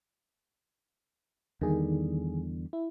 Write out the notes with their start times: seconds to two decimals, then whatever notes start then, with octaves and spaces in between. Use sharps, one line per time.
1.61 E2 D3 D#3 G3 G#4
2.73 E4